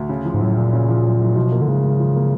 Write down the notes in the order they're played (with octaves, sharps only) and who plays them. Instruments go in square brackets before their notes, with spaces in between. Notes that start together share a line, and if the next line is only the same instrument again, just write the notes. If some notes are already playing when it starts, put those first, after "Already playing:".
Already playing: [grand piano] D2
C#3
F3
[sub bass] G#2
[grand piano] F#2 [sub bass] A2
[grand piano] F#1 [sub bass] A#2
[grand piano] C#3
F3
F#2
F#1
[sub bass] B2 [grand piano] F3
[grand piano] A#3
[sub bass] D3
[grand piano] G#2 [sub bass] C#3
[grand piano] G#1
F3
A#3